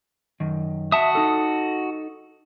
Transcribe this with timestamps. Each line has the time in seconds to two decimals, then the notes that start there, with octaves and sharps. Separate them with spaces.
0.40 F#2 D#3
0.92 F#4 E5 A5 D#6
1.15 D#4 A4